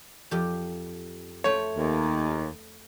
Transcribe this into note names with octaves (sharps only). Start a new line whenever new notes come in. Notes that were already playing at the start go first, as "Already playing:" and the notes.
F2 G4
A3 C5 C#5
D#2